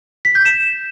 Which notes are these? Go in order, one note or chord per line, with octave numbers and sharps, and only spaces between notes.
B6
G6
E7